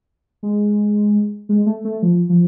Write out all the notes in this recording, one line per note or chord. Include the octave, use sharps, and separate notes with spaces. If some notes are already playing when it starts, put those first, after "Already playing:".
G#3
G#3
A3
A3
F3
F3